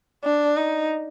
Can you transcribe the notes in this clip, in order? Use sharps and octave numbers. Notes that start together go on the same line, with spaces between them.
D4
D#4